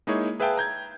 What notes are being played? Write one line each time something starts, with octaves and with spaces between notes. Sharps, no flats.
G#3 A#3 D#4 E4 G#4 C#5
G#4 B4 E5 F5 G5 A5
A#5 G6 G#6